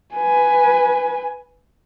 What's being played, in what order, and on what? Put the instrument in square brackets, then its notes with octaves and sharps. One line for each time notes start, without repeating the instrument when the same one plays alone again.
[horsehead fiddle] B4 G#5